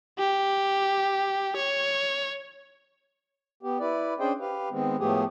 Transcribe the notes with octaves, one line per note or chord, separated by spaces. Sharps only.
G4
C#5
B3 G4
E4 B4 D5
C#4 D4 G#4 C5 D#5 G5
G4 B4 F5
D#3 G#3 B3 C4
A2 F3 A3 B3 G4 G#4